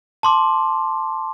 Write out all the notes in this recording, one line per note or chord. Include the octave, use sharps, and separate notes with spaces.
A5 C6 D6